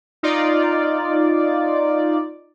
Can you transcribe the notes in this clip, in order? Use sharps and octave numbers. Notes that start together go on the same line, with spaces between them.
D#4 F4 D5